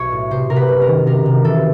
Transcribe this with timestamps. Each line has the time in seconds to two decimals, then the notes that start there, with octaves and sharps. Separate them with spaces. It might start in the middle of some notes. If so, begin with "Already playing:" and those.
Already playing: B1 C#5
0.12 A2
0.31 C3 C5
0.50 C3 A#4
0.56 B4
0.69 F#1
0.81 A#4
0.88 D#3
1.06 C3 A#4
1.26 C3
1.44 E3 A4